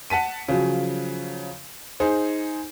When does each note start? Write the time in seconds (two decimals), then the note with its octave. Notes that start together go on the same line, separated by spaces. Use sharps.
0.10 F#5 A5 B6 D#7
0.49 C#3 F3 F#3
2.00 D#4 G#4 C5